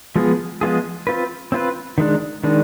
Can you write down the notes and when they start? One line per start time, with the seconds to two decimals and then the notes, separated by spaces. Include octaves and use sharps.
0.16 F3 G#3 B3 F4 G#4
0.61 F3 G#3 B3 F4 G#4
1.07 C4 F4 B4
1.52 C4 F4 B4
1.98 D#3 G#3 D4
2.44 D#3 G#3 D4